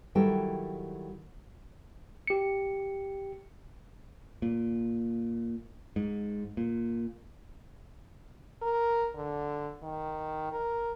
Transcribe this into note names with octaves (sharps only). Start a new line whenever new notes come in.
D#3 F#3 G3 E4 A4 G5
G4 C#7
A#2
G#2
A#2
A#4
D3
D#3
A#4